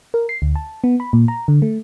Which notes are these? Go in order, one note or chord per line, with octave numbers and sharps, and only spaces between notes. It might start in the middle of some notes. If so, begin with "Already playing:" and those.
A#4
C7
D2
A5
B3
B5
A#2
A#5
D3
A3